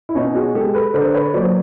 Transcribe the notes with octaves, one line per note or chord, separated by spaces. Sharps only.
E4
B2 C#4 D#4
F#4 G#4
G#3 G4 A4
A4 B4
D3 A#4 C5
B4 C#5
F#3 A#3 C5 D5